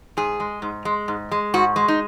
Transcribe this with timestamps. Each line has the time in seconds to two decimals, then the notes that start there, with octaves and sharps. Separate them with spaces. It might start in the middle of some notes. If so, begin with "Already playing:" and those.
0.17 G#2 G#4
0.40 G#3
0.62 G#2
0.85 G#3
1.08 G#2
1.31 G#3
1.54 G#2 F#4
1.76 G#3
1.88 D#4